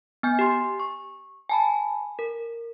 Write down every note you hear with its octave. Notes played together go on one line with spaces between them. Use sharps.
B3 G#5 G6
G4 C6
C#6
G#5 A5 B5
A#4